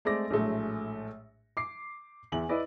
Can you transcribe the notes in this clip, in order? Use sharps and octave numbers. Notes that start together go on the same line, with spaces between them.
G#3 A3 C4 D5 D6 A#6
A#1 A2 F#3 G#3 A3
D6 C7
E2 E3 E5 F#7
E4 B4 D5 D#5